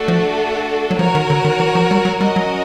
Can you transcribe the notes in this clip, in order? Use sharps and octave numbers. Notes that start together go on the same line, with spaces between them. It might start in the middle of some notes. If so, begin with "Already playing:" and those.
Already playing: A3 D4 F#4 A4
F3
F#3
F3 F#4 A#4 C#5
D#3
D3
D#3
E3
F3
G3
F#3
G3 C#4 F#4 A#4 D#5
F#3